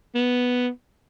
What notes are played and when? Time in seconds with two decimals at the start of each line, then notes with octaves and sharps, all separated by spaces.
0.15 B3